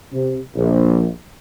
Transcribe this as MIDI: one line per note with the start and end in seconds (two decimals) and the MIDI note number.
0.13 0.39 48
0.55 1.07 34